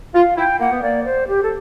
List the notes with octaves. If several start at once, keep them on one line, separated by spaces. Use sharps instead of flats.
F4 F5
E4 G5
A#3 F#5
B3
A#3 D5
C5
G4
A4